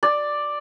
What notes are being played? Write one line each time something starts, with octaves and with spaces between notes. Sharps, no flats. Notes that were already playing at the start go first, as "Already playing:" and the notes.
D5